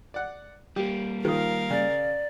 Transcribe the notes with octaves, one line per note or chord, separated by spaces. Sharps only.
D5 F#5
G3 A#3 G4
D#3 F3 A#4 F5 D#6
C#3 D5